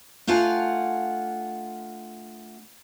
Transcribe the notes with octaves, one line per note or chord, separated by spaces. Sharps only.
A3 D4 F4 F5 F#5 G#5